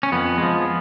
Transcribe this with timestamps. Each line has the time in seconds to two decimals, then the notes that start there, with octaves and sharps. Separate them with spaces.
0.03 C#4
0.12 F2 B3
0.38 F3 G#3